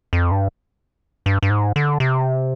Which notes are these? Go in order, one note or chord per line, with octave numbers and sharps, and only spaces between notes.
F2
G2
G2
G2
G#2
D3
C3